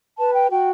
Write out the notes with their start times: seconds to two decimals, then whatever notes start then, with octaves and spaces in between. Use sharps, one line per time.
0.17 B4 A5
0.34 G5
0.51 F#4 G5